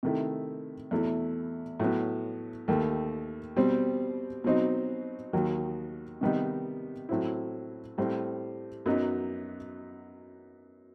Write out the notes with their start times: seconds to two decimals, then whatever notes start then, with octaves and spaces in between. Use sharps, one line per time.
0.03 C3 D#3 A3 E4
0.91 E2 B2 A3 E4
1.80 A2 F#3 B3
2.68 D#2 D#3 A3
3.56 B2 G3 C4
4.44 B2 F#3 C4 D#4
5.33 D#2 D#3 F#3
6.21 C3 D#3 G3 B3 D#4
7.09 A2 F#3 C4 E4
7.98 A2 G3 C4
8.86 F#2 F#3 B3 D#4